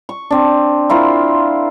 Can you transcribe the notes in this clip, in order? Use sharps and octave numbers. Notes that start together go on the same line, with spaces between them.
C#6
C4 D4
E4 F4 A#4 C5